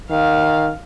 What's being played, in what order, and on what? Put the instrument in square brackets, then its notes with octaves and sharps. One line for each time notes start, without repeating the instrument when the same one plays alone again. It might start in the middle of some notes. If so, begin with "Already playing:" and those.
[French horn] D#3 [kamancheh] F5